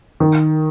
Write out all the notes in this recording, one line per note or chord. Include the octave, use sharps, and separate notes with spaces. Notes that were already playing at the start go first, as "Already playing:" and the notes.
D#3